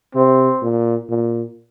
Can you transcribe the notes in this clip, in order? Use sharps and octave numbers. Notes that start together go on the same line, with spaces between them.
C3 C4
A#2
A#2